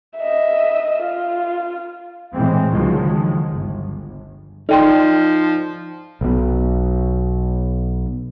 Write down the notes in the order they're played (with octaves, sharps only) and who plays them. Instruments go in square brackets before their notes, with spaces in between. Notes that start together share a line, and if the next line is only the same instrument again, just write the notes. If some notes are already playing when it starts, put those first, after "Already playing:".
[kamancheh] D#5 E5
F4
[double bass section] A2 E3 G#3 C4
C#2 D3 D#3 F3 F#3 G#3
G1
[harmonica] F3 [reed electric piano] D#4 [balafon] A4 G5 C6 [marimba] D5
[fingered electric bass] B1 B2